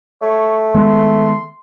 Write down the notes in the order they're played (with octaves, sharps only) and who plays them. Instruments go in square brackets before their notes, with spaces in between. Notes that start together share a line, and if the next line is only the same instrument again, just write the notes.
[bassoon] A3 [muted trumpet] C#5
[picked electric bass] D#3 G#3 B3 [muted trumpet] C6